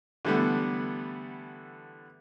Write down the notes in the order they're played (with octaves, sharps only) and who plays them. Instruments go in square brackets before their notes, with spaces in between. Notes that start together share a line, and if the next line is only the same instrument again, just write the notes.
[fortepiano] D3 E3 G3 A3 B3